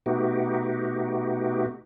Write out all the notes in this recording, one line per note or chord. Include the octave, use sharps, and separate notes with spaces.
B2 A3 B3 D#4 F#4 G4